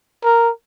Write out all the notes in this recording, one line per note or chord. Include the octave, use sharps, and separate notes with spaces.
A#4